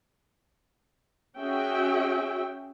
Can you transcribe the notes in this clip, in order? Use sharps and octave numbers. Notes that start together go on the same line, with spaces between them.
C#4 F#4 G#4 E5 G5